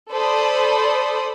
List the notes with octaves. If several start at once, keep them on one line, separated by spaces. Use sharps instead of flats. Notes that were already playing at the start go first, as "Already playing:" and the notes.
A4 C5 D5 B5 D#6